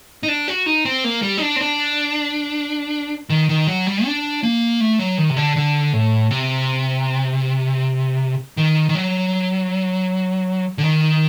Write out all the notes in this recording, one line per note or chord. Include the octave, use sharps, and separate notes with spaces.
D#4
D4
F#4
D#4
C4
A#3
G3
D#4
D4
C4
D4
D#3
D#3
F#3
G3
D4
A#3
A3
F#3
D#3
C3
D3
D3
A2
C3
D#3
D#3
F#3
D3
D#3